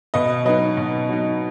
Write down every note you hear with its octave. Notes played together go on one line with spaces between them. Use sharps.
B2 B4 D#5
F#3 D#4 B4 D#5
B2
F#3 D#4